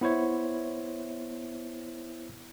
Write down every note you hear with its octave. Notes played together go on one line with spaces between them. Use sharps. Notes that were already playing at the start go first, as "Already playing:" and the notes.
B3 E4 C5 C#5 E5